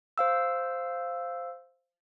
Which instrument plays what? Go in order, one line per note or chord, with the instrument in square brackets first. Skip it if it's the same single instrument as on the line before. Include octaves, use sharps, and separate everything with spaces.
[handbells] C5 F5 E6